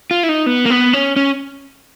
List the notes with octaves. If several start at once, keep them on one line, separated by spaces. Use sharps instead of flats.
F4
E4
D#4
B3
A#3
B3
C#4
C#4